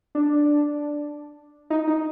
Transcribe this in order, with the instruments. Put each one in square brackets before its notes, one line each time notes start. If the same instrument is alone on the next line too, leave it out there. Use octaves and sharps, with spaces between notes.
[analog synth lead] D4
D#4
D#4